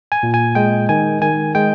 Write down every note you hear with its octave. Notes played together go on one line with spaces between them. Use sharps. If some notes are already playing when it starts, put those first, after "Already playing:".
G#5
A#2
G#5
G#3 G5
D#3 G#5
D#3 G#5
G#3 G5